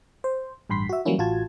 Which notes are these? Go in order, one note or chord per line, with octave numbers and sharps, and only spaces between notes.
C5
A1 G2 B5 C6 B6
F#4 E5
E3 F#3 G3 A#3 C#4 E4
A1 F4 F#4 A5 G#6